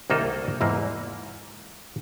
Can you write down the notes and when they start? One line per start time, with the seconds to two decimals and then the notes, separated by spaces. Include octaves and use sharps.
0.10 C2 D#3 A#3 D#4 A4 A#4
0.61 E2 G#2 E3 A#3